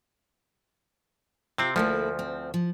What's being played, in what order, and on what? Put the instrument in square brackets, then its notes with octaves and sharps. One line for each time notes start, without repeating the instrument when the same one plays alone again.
[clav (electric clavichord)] C3 C4 [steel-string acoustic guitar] F4 G4
[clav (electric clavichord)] D2 F3 [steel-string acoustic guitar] A3 A#3 E4
[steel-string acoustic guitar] C4
F3